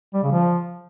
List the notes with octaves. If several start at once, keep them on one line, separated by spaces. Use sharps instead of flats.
G3
C#3
F3